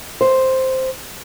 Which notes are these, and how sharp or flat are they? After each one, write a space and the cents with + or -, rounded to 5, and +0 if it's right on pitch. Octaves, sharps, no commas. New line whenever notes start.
C5 +0